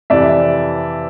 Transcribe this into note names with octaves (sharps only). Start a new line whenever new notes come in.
F2 C3 E3 D5 E5